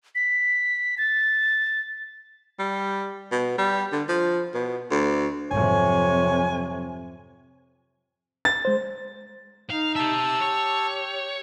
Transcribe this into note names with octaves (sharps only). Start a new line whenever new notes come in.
B6
A6
G3
B2
G3
D3
F3
B2
D2
F2 G#2 C3 F#3 C#5 G#5
A6
G#3 C5
D#4 F5
G4 E5 A5 E6
G4 C#5